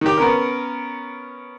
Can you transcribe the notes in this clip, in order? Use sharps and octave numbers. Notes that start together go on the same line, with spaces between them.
D#3 G4
B3 C#4 A#4